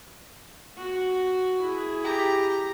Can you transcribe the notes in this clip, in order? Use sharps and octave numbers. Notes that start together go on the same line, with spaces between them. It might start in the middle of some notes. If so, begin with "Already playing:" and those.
F#4
E4 G#4
G4 A#5